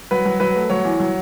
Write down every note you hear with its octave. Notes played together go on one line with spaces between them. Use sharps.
F#3 B4
F#3
F#3 B4
A3
F#3 C#5
E2
F#3